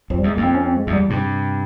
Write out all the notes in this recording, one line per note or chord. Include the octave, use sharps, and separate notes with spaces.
F2 F3
G3
E2 G#3
F2 A#3
C4
C#4
C4
G#3
E2
G3
G2 C3